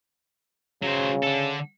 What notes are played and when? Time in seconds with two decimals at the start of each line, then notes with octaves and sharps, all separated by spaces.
0.82 C#3 F#3 C5
1.23 D3 A4